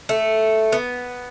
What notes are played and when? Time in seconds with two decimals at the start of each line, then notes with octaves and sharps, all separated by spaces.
0.09 A3
0.72 B3